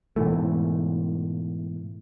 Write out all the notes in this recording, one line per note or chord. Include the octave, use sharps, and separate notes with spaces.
G#2 B2 E3 A3